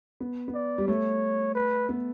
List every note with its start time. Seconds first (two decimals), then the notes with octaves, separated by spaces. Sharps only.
0.20 B3
0.48 B3
0.54 D5
0.78 G3
0.88 A3 C#5
1.55 B4
1.89 B3